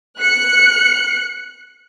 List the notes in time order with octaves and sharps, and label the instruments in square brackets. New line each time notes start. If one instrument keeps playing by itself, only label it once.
[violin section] F#6 C#7